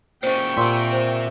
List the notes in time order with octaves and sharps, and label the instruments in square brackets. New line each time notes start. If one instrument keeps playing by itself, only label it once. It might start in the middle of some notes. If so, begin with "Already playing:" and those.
[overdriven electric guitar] A#2 C#3 [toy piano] C5 D#5 [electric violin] G5 C#6
[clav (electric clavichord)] A#2 [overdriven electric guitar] C4 E5 [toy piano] G4 C6
[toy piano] C5